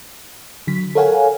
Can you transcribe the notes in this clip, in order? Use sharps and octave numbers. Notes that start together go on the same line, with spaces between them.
D3 F#3 B6
A4 A#4 C#5 F5 F#5 G#5